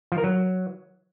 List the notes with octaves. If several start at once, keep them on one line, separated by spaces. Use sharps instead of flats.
F3
A#4
F#3